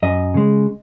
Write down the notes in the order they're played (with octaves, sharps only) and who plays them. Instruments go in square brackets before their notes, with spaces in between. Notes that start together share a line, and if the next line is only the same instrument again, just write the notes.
[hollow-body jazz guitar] F#2 D#5
C#3 G#3